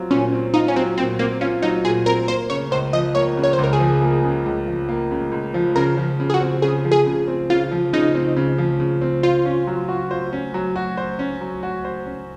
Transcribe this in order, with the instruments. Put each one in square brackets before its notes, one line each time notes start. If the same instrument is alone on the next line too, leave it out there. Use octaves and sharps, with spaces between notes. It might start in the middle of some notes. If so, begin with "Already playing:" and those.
Already playing: [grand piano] F#3 C4 F4
[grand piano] A#2 [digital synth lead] C#4
[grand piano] C4
[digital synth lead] D#4 [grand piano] F4
[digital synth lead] C#4
[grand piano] F#3 [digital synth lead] C4
[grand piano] A#2 [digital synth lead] C4
[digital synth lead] A#3 [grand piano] C4
[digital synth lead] C#4 [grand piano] F4
[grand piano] F#3 [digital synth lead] D#4
[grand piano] A#2 [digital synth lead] G#4
[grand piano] C4 [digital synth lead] A#4
[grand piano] A#3 [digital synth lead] C5
[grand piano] C#3 [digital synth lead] C#5
[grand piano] C#2 [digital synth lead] C5
[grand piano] F3 [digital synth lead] D#5
[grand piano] A#3 [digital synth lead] C#5
[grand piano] C#3
[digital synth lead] C#5
C5
[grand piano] C#2
[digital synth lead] A#4
G#4
[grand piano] F3
A#3
C#3
C#2
F3
A#3
C#3
C#2
F3
[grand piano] C#3 [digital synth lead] A#4
[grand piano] F3
C#3
[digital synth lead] G#4
F#4
[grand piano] C4
[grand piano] C#3 [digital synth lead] G#4
[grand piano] F3
[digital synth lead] G#4
[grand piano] C#3
C4
[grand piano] C#3 [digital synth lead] F4
[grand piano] F3
[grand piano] C#3 [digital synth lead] D#4
[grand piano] C4
C#3
F3
C#3
C4
[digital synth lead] F4 [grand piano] C5
[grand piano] C#4
F#3
F#4
C5
C#4
F#3
F#4
C5
C#4
F#3
F#4
C5
C#4